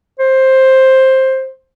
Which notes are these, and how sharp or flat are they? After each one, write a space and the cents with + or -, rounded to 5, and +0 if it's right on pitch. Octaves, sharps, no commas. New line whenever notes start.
C5 +10